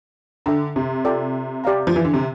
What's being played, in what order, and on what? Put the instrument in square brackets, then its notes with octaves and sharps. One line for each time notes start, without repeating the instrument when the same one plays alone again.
[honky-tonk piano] D3 [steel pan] A4 E5 G5 A#5
[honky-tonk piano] C3
[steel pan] F4 A4 D5 G5
G4 D5 F5 A#5
[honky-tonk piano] F3
E3
D3
C3